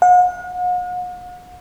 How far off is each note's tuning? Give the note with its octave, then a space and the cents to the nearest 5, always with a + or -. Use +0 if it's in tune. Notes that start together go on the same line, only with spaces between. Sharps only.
F#5 -45